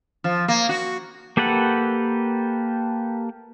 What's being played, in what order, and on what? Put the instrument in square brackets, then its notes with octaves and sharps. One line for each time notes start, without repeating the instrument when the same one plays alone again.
[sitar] F3
A#3
F#4
[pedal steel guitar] A#3 G4 A4 B4 F#5